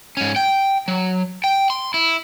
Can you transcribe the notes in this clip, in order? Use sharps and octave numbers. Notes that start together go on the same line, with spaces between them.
G#2 C#4
G5
F#3
G5
C6
E4